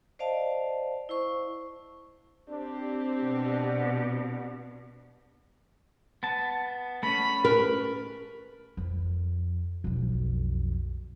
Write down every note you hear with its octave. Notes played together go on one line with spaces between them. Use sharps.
C5 D5 D#5 F5 A5
E4 C5 C#6
C4 D4 G4
B2
B3 A5
A3 C#4 B5
A#4 B4
F2
B1 F2